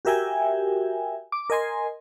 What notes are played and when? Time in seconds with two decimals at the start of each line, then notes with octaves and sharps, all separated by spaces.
0.05 F#4 G4 A#4 E5 G5 G#5
1.32 D6
1.50 A#4 D#5 G#5 C6